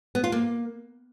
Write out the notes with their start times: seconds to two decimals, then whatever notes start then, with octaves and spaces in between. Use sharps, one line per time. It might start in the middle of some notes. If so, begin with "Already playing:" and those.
0.15 B3
0.24 F4
0.32 A#3